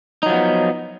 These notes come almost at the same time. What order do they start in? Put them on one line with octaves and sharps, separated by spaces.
D#4 F#3 F3 B3